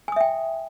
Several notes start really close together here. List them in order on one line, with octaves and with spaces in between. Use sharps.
G#5 D#6 E5 G5